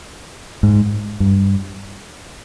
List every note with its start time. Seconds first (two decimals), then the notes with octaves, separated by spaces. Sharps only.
0.63 G#2
1.20 G2